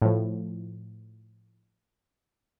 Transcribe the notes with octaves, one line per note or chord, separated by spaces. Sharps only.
A2 F3